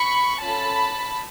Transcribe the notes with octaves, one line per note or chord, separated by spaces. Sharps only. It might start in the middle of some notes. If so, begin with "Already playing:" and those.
Already playing: B5 C#6
C#4 F4 A4 A5 B5